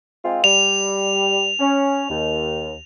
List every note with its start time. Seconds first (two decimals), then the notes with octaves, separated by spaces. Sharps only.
0.24 G#3 C4 F4
0.44 G3 F7
1.60 C#4
2.09 D#2